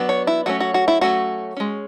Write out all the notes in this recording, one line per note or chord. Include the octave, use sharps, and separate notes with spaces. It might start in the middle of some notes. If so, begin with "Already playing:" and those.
Already playing: F#3 B3 D4
C#5
E4
F#3 A3 C#4 F#4
F#4
F#4
E4
F#3 A3 C#4 F#4
G#3 C#4